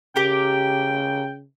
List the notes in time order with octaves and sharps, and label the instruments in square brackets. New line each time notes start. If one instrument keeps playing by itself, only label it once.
[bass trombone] C#3 [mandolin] G4 A#4 [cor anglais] G5